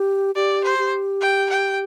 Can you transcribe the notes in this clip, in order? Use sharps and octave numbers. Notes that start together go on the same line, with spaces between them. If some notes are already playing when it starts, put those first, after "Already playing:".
Already playing: G4
G4 D5
C5
G4
G5
G5